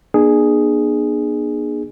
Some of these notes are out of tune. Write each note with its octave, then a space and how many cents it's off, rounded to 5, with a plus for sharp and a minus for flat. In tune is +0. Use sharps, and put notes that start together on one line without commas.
B3 -40 D4 +40 G#4 +0